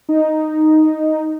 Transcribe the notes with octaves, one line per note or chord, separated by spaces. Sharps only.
D#4